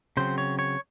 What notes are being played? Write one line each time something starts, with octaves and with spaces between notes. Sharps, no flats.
C#3 F#3 C4 C5
C#5
C#5